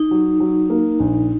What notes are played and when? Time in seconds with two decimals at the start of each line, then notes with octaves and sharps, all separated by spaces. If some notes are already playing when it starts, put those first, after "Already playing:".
Already playing: D#4
0.11 F#3
0.40 F#3
0.70 A#3
1.00 A#1